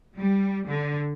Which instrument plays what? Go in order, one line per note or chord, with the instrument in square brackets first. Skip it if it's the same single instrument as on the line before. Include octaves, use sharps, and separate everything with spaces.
[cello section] G3
D3